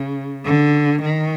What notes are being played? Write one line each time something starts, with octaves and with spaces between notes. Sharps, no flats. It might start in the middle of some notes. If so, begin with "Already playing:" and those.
Already playing: C#3
D3
D#3